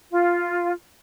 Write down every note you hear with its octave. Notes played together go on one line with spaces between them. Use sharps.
F4